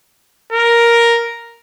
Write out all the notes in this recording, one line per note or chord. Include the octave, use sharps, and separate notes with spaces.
A#4